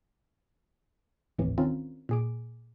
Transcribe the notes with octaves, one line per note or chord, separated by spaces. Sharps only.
G#1 D#2 A2 C3 E3
D#3 C4 C#4 F4 A#4
A#2 G#4 D6